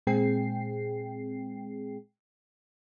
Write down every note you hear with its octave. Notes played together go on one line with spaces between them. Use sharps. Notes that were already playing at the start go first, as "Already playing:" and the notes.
A#2 G#3 C4 G#4 G5 C7